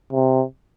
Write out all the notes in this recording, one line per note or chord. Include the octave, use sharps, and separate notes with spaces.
C3